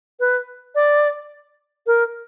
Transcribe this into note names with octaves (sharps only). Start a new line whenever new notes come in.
B4
D5
A#4